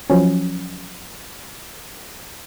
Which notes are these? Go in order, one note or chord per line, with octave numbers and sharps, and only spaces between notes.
F3 F#3 C#4